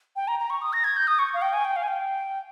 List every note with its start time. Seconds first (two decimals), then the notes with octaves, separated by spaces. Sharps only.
0.16 G5
0.28 A#5
0.39 A#5
0.50 C#6
0.62 D#6
0.73 A#6
0.84 G#6
0.97 G6
1.07 D#6
1.19 C#6
1.34 F5
1.42 G5
1.53 G#5
1.65 G5
1.76 F5
1.83 G#5
1.88 G5